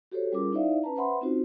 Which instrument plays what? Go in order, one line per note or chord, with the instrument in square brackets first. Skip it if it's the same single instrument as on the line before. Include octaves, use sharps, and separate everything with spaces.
[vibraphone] F#4 G4 A4 C5 C#5
G3 C#4 F4 G#4 A#4 D6
D#4 E4 C5 D5 E5 F5
C#4 B4 A5 A#5
B4 C5 E5 F#5 B5 C6
C4 C#4 D#4 F4 F#4 C5